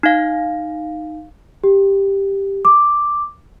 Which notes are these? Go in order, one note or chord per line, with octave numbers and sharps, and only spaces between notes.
D#4 F5
G4
D6